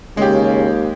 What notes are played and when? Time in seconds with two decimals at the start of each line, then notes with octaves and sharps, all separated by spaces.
0.17 D#2 C#3 G#3 G4